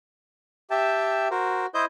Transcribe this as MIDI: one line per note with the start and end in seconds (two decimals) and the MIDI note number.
0.71 1.28 67
0.71 1.28 76
0.71 1.28 79
0.71 1.28 81
1.31 1.66 66
1.31 1.66 70
1.31 1.66 72
1.74 1.85 64
1.74 1.85 72
1.74 1.85 75
1.74 1.82 91